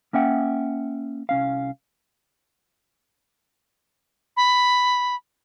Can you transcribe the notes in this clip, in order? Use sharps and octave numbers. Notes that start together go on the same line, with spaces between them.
A#3 C#4 E5 F#5 G5
C2 C#4 F5
B5